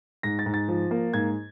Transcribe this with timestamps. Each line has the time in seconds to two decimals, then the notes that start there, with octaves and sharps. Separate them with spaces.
0.23 G#2 A#6
0.39 A6
0.46 G#2
0.54 A6
0.68 F3
0.91 A#3
1.14 G#2 G#6